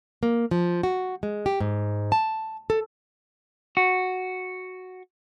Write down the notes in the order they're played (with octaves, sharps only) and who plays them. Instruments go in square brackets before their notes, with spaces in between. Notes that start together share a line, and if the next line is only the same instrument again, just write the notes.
[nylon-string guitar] A#3
F3
F#4
G#3
G4
G#2
A5
A4
[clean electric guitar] F#4